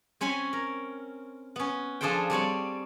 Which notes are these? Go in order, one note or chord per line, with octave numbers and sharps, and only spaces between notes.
C4 C#4 C#5 G#5 B5
A#4
B3 C#4
F3 D4 G#4 A4 C5 G5
G3 C4 C#5 D5